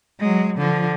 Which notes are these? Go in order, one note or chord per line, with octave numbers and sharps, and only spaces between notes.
F#3 G#3
D3 F3